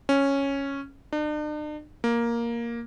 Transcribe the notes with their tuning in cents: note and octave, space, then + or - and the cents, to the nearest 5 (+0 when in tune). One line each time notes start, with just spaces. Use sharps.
C#4 -5
D4 +45
A#3 +5